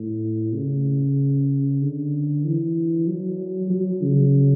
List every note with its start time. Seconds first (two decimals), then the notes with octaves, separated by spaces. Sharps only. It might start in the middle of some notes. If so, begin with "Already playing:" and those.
Already playing: A2
0.53 C#3
1.81 D3
2.44 E3
3.07 F#3
3.70 F#3
4.02 C#3